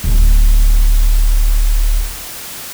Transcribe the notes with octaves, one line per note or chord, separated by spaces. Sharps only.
D1 G#3